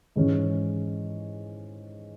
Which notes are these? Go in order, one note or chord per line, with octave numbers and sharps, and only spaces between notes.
G#2 E3 G#3 C#4